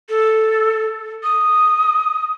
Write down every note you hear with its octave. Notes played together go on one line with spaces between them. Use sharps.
A4
D#6